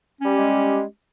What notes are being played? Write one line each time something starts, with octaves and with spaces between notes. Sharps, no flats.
G3 G#3 C#4 G4